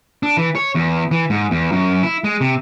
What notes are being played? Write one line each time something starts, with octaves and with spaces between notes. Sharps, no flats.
D4
E3
C#5
E2
E3
G#2
E2
F#2
E4
G#3
C3